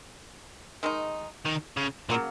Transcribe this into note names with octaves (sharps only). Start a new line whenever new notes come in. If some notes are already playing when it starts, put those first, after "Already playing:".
D#3 G#3 D#4
D#3
C#3
A#2 C#3 F#3 A#3